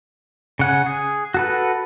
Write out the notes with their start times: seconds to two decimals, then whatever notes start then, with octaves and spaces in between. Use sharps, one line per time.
0.59 C#3 F#5 G#5
0.86 G#4
1.34 F#4 A4 B4